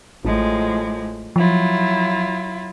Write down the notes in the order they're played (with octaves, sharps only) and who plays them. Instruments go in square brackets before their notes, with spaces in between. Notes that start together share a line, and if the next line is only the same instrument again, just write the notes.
[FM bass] A1 [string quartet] A2 F3 G#3
[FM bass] F3 [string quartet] F#3 E4 F4